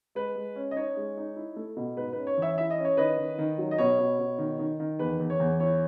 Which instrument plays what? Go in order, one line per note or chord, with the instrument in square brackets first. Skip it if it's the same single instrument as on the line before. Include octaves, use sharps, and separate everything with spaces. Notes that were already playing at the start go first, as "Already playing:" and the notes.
[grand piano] G#3 B4
G#3
C#4
D#5
D#4 C#5
G#3
D#4
E4
A3
B2
G#2 B4
C#4 B4
C#5
E3 C#5 E5
E4 E5
D#5
C#4
C#5
D#3 B4 D#5
D#3
D#3
F#3
D#5
B2 C#5
B2
B2
D#3
D#3
D#3
E2 B4
E2
C#5
E2
E4 C#5